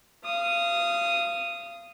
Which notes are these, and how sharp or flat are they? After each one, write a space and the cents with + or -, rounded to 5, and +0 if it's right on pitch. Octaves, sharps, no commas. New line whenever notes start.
F5 -25 D#6 +0